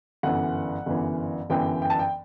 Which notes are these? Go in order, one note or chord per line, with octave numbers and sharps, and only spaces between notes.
G1 F#2 E3 F#5
G1 F#2 E3
G1 F#2 E3 G5
G5
A5
G5